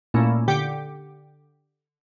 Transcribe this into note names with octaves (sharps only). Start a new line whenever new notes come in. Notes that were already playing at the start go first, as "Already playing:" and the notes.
A#2 A3 A#3 C#4 E4
D3 G4 G5 D6 C#7